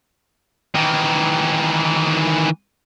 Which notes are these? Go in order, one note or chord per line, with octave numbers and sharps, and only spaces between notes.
D#3 E3